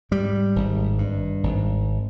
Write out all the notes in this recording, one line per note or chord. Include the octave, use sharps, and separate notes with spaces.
G#2 G3
G#1
G2
G#1